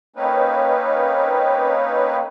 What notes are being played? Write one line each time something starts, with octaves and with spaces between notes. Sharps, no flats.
A#3 C4 C#4 D#4 B4